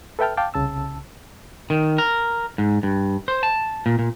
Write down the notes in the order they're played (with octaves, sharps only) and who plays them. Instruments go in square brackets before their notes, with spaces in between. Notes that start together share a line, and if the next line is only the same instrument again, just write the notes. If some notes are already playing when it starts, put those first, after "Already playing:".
[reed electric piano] A4 B4 E5 G5 A5 F6
F5 G5 A5 D6
C2 C#3 A5 E6
[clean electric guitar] D#3
A#4
G#2
G2
C5
A5
A#2
A#2